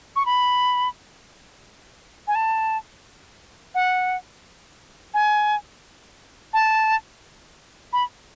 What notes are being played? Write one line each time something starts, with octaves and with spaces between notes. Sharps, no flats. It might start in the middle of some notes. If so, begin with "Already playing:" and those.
C#6
B5
G#5
A5
F#5
G#5
A5
B5